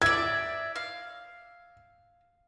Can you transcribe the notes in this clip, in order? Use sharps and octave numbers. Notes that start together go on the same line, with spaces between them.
D5 E5 G#6
F5